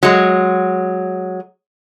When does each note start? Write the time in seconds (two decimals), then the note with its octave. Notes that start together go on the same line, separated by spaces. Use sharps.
0.03 F#3 G#3